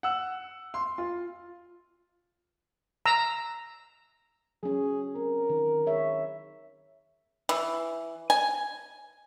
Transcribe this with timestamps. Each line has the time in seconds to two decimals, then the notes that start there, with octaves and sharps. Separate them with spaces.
0.03 F#5 E6
0.74 C6
0.98 F4
3.06 A#5 E6
4.63 F#3 C#4 G#4
5.16 C4 A#4
5.50 D#3
5.86 G#4 C#5 E5
7.49 E3
8.30 G#5